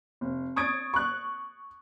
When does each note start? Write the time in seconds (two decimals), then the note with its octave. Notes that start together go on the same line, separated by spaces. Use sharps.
0.21 F1
0.56 C#6 D#6 G#6 A6 D7
0.94 C#6 F#6